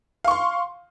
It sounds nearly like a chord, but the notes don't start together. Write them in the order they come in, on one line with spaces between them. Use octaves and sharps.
F5 C#6 C6